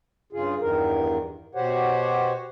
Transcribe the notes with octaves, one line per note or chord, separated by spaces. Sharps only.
G2 C#3 F4 G#4
E2 G2 D#3 A#4
B2 F#4 G4 C5 C#5 F#5